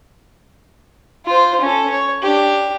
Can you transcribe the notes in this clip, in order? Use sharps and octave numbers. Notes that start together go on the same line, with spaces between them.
F4 C5
C#4 A4
C#5
D4 G4